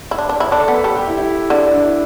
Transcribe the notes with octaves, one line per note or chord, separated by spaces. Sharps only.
E4
D4
D4
E4
D4 A4 A5
A4 A5
B3
B4 B5
G3 A4 A5
G4 G5
E4
E4
D3
D4
E4